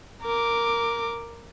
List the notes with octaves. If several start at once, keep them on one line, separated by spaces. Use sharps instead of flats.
A#4 D6